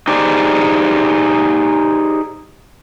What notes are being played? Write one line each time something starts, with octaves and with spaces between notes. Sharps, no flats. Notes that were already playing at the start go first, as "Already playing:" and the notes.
D#4 G4 G#4 C5 D5